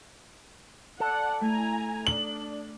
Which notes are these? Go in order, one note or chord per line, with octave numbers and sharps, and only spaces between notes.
A4 D5 F#5
A3 E4 G#5 A#5
D4 D5 D#6 F#7